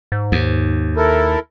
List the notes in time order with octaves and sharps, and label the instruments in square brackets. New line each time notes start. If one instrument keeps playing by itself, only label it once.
[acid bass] G#2
[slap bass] D#2
[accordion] E4 A4 A#4